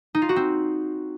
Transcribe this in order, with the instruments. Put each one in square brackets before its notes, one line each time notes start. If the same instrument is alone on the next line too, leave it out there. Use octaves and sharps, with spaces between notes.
[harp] D#4
F4
F#4
C4